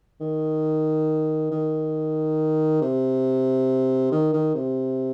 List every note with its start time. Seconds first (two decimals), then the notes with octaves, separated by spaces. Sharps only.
0.21 D#3
1.51 D#3
2.82 C3
4.11 D#3
4.33 D#3
4.54 C3